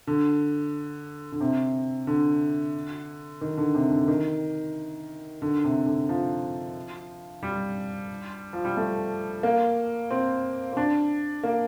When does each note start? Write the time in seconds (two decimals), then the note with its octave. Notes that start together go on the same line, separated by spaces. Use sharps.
0.07 D3
1.32 D3
1.40 C3
2.07 D3
3.41 D#3
3.57 D3
3.75 C3
3.91 D3
4.08 D#3
5.42 D3
5.64 C3
5.86 D3
6.09 F3
7.43 G3
8.53 F3
8.65 G3
8.77 A3
9.43 A#3
10.11 C4
10.73 C4
10.77 D4
11.44 A#3